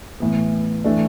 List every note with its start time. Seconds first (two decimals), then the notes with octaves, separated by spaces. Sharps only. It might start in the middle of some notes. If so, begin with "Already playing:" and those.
0.20 A2 E3 B3
0.84 E3 A3 D4